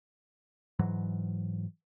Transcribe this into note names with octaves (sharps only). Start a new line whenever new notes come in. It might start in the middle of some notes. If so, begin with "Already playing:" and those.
G#2 E3 F#3